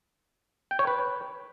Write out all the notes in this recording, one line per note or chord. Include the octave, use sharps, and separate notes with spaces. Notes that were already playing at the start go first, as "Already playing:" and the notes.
G5
C#5
B4